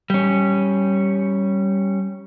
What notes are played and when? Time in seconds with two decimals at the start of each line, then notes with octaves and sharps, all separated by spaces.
0.10 G3 C#4